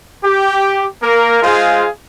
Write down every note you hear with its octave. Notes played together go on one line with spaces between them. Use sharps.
G4
A#3 A#4
G#3 F4 G#4 C5 F5